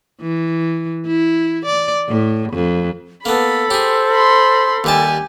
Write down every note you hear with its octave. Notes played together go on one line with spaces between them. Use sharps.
E3
E4
D5
A2
F2
A#3 B3 A4 B5
G4 G#4 C5
B5 C6
D#2 G3 G4 G#5 A5